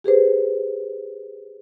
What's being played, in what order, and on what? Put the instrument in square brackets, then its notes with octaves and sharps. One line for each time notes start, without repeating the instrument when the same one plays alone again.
[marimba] G4 G#4 B4 C5